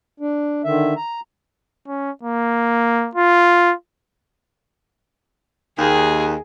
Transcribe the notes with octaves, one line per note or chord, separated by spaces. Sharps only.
D4
D3 D#3 E5
A#5
C#4
A#3
F4
D#2 D#3 G#4